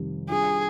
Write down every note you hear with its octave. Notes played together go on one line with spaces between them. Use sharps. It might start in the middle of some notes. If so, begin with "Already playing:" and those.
Already playing: F2 C3 D#3 G3
G3 D4 F4 G#4